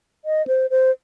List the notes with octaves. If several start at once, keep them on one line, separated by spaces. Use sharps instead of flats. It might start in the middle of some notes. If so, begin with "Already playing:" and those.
D#5
C5
C5